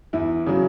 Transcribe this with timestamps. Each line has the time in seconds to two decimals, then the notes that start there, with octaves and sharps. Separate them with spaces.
0.13 E2 E4
0.46 C#3 F#3